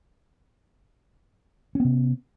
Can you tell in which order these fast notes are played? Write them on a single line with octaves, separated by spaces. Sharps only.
C#4 B3 C3